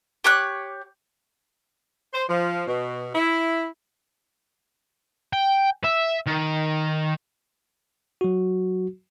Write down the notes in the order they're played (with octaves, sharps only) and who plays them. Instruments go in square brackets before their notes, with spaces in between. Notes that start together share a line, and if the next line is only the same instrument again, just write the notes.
[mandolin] G4 C#5 D6 F#6
[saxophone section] C5
F3
B2
E4
[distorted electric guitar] G5
E5
D#3
[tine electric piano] F#3 F#4